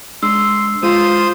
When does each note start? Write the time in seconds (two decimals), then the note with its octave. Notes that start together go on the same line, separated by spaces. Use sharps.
0.23 G#3 D4 C6 E6
0.83 G#3 F4 C5 D#6